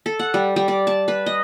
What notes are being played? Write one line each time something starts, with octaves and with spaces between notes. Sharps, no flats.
A4
F#5
G3
G3
D5
A5
B4
D#5